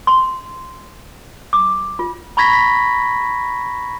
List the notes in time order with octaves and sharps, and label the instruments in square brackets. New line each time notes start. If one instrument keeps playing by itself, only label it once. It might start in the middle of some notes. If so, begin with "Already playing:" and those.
[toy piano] C6
D6
F4
[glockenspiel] A#5 B5 C#6 G#6 A#6 B6
B6